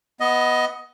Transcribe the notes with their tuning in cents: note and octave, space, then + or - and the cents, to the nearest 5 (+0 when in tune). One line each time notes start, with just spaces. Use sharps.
B3 +0 D#5 +15